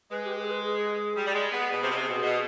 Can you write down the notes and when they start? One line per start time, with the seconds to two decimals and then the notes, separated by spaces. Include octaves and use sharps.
0.11 G#3 B4
0.25 G4
0.38 B4
0.44 G#4
0.51 B4
0.65 G#4
1.17 G3
1.27 G3
1.35 G#3
1.52 B3
1.70 B2 G#4
1.83 C3
1.91 B2
1.96 C3
2.09 B2
2.23 B2